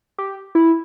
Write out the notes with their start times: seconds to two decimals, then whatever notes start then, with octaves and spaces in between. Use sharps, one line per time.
0.18 G4
0.55 E4